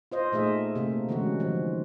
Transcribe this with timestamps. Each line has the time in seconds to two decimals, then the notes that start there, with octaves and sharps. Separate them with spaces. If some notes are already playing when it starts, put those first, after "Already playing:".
0.12 F4 C5 D#5
0.32 A#2 A3 D#4 G#4 D#5 E5
0.75 C3 A3 A#3
1.09 D3 E3 G#3 C#4 F#4
1.40 D#3 F3